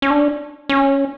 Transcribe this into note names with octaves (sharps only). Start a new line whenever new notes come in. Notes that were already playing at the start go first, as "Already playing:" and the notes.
C#4
D4
C#4